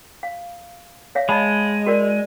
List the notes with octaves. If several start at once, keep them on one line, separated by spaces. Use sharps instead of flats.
F5
C#5 E5 F5
G#3 D#5 A5 B5
F#4 A#4 D5